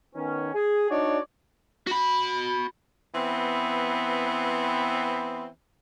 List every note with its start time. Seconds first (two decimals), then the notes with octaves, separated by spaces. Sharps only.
0.15 D#3 B3 C#4
0.55 G#4
0.89 D4 D#4 F#4 C#5 D5
1.87 F#4 B5
3.15 E3 B3 C4